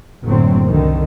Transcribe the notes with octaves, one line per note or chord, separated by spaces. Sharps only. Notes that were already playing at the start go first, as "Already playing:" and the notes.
F#1 A2 D3 F#3 C4
C2 D3 D#3